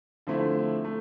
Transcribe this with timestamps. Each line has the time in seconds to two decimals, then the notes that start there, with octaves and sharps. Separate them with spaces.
0.27 D3 F3 A3 C4 E4
0.85 A3